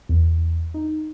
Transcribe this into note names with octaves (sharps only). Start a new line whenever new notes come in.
E2
D#4